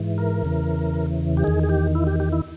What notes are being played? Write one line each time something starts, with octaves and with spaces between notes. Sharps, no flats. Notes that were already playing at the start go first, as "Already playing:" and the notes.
Already playing: G#2 E3
A#4
E2 C#3 E3
G4
E2 D#3 G#4
G#4
G4
E4
G4
G4
E4